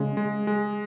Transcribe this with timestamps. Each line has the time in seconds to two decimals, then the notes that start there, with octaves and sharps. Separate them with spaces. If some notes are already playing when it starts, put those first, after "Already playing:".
Already playing: C#3 G#3
0.17 G#3
0.47 G#3